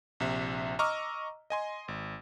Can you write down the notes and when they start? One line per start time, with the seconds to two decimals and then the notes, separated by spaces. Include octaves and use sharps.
0.20 A#1 C3 E5
0.79 D#5 A#5 C#6 D6 E6 F6
1.50 D#5 G#5 C6
1.88 G#1